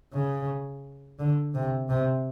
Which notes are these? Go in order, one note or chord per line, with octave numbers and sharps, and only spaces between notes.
C#3
D3
C3
C3